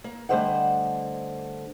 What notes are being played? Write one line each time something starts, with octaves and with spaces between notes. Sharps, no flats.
A#3
D3 G3 A3 C5 D#5 F#5